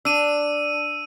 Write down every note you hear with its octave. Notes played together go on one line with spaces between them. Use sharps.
D4 E6 D#7